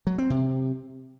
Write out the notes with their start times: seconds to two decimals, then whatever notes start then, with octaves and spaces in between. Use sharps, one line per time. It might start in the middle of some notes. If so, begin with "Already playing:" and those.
0.07 F#3
0.18 C4
0.30 C3